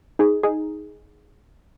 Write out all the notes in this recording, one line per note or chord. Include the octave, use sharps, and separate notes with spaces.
D#4 G#4
D#4 G#4